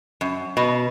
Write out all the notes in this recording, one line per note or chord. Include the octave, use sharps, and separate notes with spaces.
F#2
B2